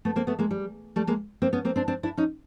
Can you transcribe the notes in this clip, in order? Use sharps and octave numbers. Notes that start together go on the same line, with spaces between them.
A3 B3
A#3 C4
A3 B3
G#3 A#3
G3
G3 A3
G#3 A#3
A#3 C4
B3 C#4
A#3 C4
C4 D4
C4 D4
D4 E4
C#4 D#4